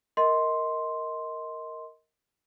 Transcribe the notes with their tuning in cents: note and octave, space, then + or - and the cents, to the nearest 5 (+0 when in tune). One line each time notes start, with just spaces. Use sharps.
A#4 +0 D#5 +20 C6 +0